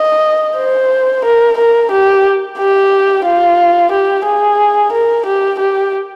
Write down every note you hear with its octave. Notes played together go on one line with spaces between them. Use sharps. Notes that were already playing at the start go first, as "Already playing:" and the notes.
Already playing: D#5
C5
A#4
A#4
G4
G4
F4
G4
G#4
A#4
G4
G4